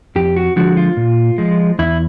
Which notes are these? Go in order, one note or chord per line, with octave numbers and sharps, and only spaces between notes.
F2 G4
F#4
D3 F3 G#3 F#4
F4
A#2
F3 G#3
E2 E4